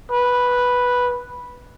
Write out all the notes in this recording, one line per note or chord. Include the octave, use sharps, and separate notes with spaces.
B4